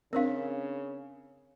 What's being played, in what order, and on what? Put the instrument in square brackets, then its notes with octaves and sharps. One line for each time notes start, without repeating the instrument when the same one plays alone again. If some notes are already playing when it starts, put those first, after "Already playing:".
[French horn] C#3 [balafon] C4 D4 [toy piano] A#4 C5 F5